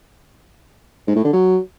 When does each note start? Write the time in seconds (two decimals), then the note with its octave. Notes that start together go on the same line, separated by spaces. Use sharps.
1.07 G#2
1.16 A2
1.24 D3
1.33 F#3